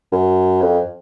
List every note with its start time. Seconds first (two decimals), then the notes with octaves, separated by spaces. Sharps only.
0.12 F#2
0.61 F2